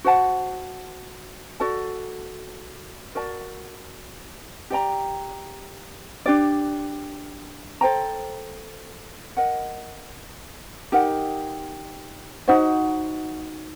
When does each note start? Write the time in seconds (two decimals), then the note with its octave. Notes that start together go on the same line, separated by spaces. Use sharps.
0.04 F#4 C5 F#5 A5
1.60 F#4 A4 D5 A5
3.15 F#4 A#4 D5 A5
4.70 G4 D5 G5 A#5
6.26 D4 G4 D5
7.81 A4 C5 G5 A#5
9.37 A#4 D#5 F#5
10.92 D#4 G4 A#4 F#5
12.48 D#4 F#4 C5 F#5